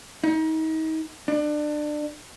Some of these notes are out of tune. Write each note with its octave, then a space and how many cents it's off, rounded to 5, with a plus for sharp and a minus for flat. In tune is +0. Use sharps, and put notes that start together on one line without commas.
D#4 +35
D4 +25